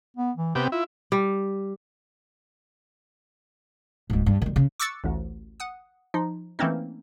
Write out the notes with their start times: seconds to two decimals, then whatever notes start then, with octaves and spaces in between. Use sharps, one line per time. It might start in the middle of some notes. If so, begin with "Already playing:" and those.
0.17 B3
0.37 E3
0.55 C3 B3 C4 G4
0.72 E4 F4
1.12 G3
4.10 D1 G#2
4.26 G2
4.42 D#3 G3
4.56 C#3
4.80 C#6 D6 E6 F#6 A6 C#7
5.04 A1 D2
5.60 F#5 D#6
6.14 F3 D#4
6.59 E3 A3 A#3 C4 C#4 D#4